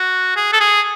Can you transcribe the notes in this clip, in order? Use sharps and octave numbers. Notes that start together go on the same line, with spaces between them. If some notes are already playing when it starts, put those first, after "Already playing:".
Already playing: F#4
G#4
A4
G#4